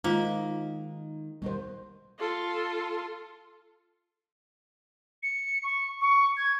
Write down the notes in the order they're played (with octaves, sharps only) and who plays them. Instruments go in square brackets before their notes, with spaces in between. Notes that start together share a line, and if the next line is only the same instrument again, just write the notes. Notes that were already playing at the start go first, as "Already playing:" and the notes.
[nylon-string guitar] D#3 G#3 [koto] A#3 [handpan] D#4 [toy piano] F4 C5 F5
[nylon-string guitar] B2 D#3 B3 [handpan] G3 C5
[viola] F4 A4
[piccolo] C#7
C#6
C#6
G#6